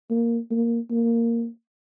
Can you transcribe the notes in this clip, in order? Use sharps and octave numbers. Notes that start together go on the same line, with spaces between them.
A#3
A#3
A#3